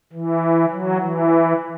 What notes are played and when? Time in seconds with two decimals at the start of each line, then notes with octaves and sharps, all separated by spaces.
0.13 E3
0.71 F#3
1.01 E3